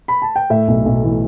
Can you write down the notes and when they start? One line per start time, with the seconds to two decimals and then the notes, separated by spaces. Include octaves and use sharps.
0.08 B5
0.22 A5
0.36 G5
0.50 A2 E5
0.68 B1
0.85 B1
1.03 E3